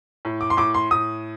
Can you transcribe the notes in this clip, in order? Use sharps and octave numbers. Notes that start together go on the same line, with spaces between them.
A2
D6
C6
A2 D6
C6
A2 D#6